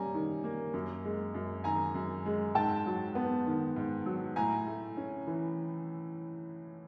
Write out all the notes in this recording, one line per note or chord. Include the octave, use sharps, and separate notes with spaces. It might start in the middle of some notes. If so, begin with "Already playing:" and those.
Already playing: G3 A#3 C#4 G#5 A#5
D#3
A#3
F#2
G#3
F#2
D#3 G#5 A#5
F#2
G#3
G#2 G5 A5
F#3
B3
D#3
G#2
F#3
A2 G#5 A#5
A3
C#4
E3